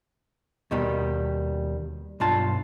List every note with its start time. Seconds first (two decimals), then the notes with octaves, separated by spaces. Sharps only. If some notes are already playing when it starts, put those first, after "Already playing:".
0.71 D#2 B2 D#3 G3
2.20 B1 G2 F4 A5